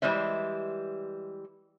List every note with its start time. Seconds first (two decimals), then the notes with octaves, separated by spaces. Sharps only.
0.02 E3 G3 G#3 C5 E5